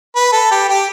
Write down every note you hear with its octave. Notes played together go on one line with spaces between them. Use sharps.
B4
A4
G4
G4